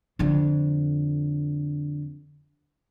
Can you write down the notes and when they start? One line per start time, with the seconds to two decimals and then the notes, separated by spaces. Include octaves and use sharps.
0.19 F2 D3